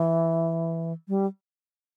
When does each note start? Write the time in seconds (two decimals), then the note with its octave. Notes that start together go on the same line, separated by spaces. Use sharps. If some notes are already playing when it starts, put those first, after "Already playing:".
Already playing: E3
1.08 G3